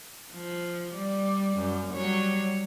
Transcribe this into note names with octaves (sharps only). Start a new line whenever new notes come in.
F3
G3 D5
F#2
F#3 G3 C#5